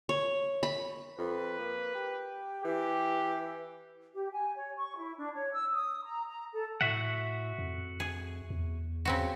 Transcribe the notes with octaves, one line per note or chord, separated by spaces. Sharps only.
C#5
B5
F2 B4
A#3
G4
E3 G4
G4
G#5
C#5
C#6
E4
D4
C#5
E6
D#6
A#5
A#5
A4
A2 F#4 E5 F#5
F2
G#4
E2
C#3 C4 F#4